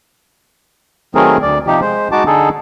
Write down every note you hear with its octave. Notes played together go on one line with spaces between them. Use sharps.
D#3 F#3 A3 C4 G#4 A#4
D2 D5
C3 F3 D#4 G4
G#3 C5
G#3 D#4 F#4 A5 D6
D3 D#4 G#4 A4